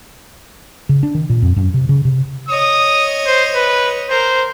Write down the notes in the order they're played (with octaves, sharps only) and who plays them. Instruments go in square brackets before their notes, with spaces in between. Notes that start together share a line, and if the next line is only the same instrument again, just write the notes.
[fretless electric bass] C#3
D4
D#3
A#2
F2
F#2
C3
C#3
C3
[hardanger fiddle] C#5 D#5 [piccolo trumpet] D#6
[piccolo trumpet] C5
B4
[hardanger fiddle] A#4 [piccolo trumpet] C5